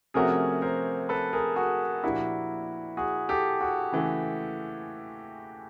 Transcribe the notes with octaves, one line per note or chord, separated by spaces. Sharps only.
C3 F3 A3 C#4 F#4 G#4 A#4
A#4 C5
A4 B4
G#4 A#4
F#4 G#4
A#2 F3 A#3 D4 E4 F#4 G4
F#4 G#4
G4 A4
F#4 G#4
C#3 E3 A3